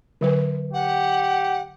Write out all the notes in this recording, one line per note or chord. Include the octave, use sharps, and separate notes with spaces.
D3 F#3 B4
G4 F#5